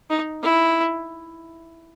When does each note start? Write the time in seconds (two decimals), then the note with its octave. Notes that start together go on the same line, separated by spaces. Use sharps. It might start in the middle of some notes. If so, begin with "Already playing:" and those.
0.10 D#4
0.43 E4